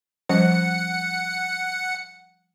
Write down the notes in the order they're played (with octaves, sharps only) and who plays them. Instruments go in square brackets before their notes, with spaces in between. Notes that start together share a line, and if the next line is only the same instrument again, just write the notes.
[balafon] F3 G3 C#4 [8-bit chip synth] F#5 C#7